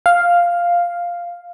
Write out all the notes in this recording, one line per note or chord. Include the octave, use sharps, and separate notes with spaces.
F5